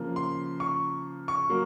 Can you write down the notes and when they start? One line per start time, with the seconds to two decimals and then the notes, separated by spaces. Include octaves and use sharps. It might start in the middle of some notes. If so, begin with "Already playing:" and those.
Already playing: C#3 F3 A#3
0.16 C6
0.60 C#6
1.28 C#6
1.49 F#3 A#3